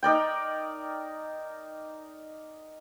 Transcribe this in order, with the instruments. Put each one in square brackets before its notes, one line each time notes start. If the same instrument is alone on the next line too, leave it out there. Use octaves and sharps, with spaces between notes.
[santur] D#4 A#4 D5 G5